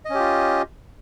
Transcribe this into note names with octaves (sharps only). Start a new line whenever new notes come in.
C#4 F4 G4 D#5